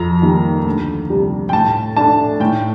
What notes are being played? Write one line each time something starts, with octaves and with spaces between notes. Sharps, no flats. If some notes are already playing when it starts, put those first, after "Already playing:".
Already playing: F2 A#5
D#3 G3 A#3
D2
C3 G3
G5
A2 A5
A3 D4 A5
A2 G5